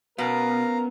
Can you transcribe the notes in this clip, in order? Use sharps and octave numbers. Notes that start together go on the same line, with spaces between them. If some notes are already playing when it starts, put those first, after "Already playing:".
B2 B3 C#4 A#4 F5 A#5